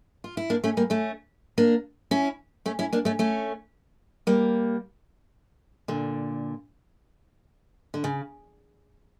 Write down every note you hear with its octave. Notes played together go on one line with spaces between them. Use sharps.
F4
E4
A#3 D4
A3 C#4
G3 A#3
A3 C#4
A#3 D4
C#4 E4
A3 C#4
C#4 E4
A#3 D4
A3 C#4
A3 C#4
G3 A#3
A#2 D3
D3
C#3